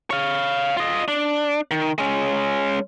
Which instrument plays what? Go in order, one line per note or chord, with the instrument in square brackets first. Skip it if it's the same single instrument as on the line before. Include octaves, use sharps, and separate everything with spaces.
[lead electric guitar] C#5 F5
F4 D#5
D4
D#3
G#3 C#4